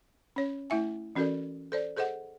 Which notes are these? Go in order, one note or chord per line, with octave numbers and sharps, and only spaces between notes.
C#4 C#5
A3 E4 E5 G#5
E3 C#4 F#4 A4 A#4 D5
A4 C5 D5
G#4 A4 C5 D#5 F#5